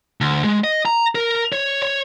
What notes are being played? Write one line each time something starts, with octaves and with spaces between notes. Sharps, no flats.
D2
G#3
D#5
A#5
A#4
C#5
C#5